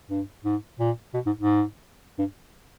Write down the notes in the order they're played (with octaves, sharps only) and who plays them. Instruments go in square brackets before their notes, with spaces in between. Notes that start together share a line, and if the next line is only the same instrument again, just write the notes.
[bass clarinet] G2
G#2
A#2
B2
G#2
G#2
G2